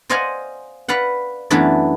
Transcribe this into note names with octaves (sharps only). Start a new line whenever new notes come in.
C5 D5 D#5 F5 F#5 G#5
B4 D5 F5 F#5
F#2 E3 A3 B3 D4 D5